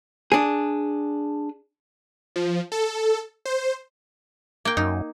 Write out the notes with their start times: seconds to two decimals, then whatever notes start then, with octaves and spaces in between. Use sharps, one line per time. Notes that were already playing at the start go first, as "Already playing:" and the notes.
0.32 D4 G#4
2.36 F3
2.72 A4
3.45 C5
4.65 A#3 G5
4.77 F#2 D#4